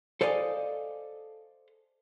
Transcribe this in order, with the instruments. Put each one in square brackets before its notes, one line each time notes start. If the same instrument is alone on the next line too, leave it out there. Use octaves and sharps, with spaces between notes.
[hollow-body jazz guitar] A4 C5 D5 D#5 F5 G#5